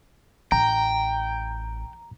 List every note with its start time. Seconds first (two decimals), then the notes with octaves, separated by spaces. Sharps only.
0.52 A1 G5 A#5